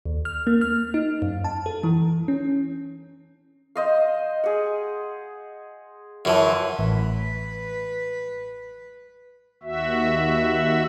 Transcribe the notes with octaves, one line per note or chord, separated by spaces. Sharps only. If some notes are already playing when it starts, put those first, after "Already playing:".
D#2
F6
A#3
F6
D#4
F#2
A5
A4
E3
C#4
C5 D#5 F5
G#4 F#5
F#2 E3 F3 F#4
A1 B4
D#2 F#4 E5